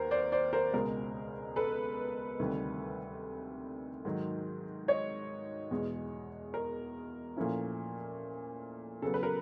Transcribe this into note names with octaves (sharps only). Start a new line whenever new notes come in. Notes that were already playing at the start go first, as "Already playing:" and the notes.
Already playing: D#2 B3 A#4 C5
C5 D5
C5 D5
A#4 C5
C#2 B2 G#3 A#4
A4 B4
D2 C3 D#3 G3
G#2 D#3 F#3
C#5 D#5
E2 B2 G#3
A#4
A#2 F3 A3 C#4 E4
C#3 F#3 B3 A4
B4
A#4